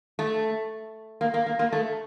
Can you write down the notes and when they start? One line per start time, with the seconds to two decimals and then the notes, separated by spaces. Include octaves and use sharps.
0.19 A3
1.21 A#3
1.34 A#3
1.46 A#3
1.59 A#3
1.72 A3